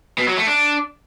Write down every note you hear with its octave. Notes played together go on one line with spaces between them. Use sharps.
B2
F#3
A3
D4